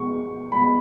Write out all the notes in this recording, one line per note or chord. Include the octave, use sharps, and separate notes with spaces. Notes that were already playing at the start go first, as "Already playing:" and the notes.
Already playing: B2 G#3 C#6
B2 G#3 B5